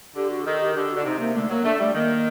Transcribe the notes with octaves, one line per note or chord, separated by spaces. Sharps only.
D3 G4
F#4
D#3 A4
G4
D3 G4
F#4
D3
C3 D#4
A#3
D3 A3
F#3 A#3
A3 D4
G3 A3
D#3 A#3